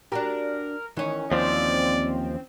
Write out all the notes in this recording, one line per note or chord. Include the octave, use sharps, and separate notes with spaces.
D4 F#4 G4 A#4
D#3 E3 C#4
D#2 F3 C4 D5